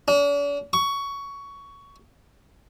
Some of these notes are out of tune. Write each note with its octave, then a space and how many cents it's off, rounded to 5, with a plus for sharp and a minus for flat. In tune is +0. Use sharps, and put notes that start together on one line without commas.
D4 -45
C#6 +15